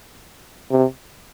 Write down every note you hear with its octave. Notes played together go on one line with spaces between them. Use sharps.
C3